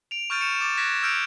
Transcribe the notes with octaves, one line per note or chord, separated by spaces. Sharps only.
D7 F7
C#6 F6 G6 A6 D7 D#7
C#7 D#7 E7
D6 A6
F#6 G#6 A#6 B6 D7 E7
E6 F6 G6 C#7 D7 F7